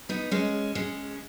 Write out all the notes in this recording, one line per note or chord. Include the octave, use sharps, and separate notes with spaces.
B3 D#4
G#3 C#4
G#3 C#4